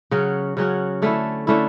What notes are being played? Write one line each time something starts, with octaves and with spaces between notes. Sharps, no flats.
C#3 F#3 C#4 F#4
C#3 F#3 C#4 F#4
D3 A3 C#4 E4
D3 A3 C#4 E4